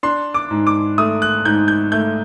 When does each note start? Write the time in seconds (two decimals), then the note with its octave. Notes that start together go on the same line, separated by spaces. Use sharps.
0.03 D4 C6
0.34 D6
0.51 G#2
0.67 D6
0.98 A3 D#6
1.22 F#6
1.45 G#2 G6
1.68 G6
1.92 A3 G6